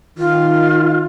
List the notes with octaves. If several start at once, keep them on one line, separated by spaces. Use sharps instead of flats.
D#3 F4